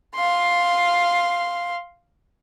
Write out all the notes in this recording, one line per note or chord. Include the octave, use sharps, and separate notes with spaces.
F5 C6